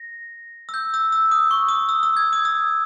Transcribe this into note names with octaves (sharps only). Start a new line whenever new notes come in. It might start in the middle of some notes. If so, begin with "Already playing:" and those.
Already playing: A#6
E6
G6
E6
E6
D#6
C#6
D#6
E6
E6
G#6
D#6
E6